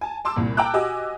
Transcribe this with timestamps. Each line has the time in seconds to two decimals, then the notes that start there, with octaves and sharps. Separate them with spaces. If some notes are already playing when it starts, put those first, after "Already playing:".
0.01 G#5 A5
0.25 A5 C6 D6 E6
0.36 C2 A#2
0.57 G5 A5 A#5 D6 E6 F#6
0.73 F#4 G4 D#5 G#5 D6 E6